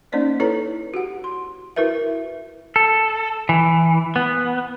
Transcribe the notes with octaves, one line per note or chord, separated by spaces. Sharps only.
A#3 C#4 D#4 C5 D5 D#5
E4 A4 B4 C#5 A#5
F#4 G4 F#5
C6
E4 F#4 A#4 B4 E5
A4
E3
B3